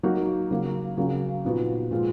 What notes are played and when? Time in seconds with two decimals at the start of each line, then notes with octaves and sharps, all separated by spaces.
0.03 F#3 A#3 D#4 F#4
0.51 C#3 F#3 A#3
0.97 C#3 F#3 A#3 C#4
1.45 A#2 F3 B3 D#4 F#4
1.91 A#2 F3 G#3 B3 F4